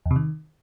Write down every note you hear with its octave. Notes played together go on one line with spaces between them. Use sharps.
E2
C3
D#3